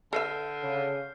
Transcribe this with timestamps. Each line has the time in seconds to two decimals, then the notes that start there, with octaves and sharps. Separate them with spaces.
0.13 D3 A4 B4 E5 F6 G6 C7
0.63 C#3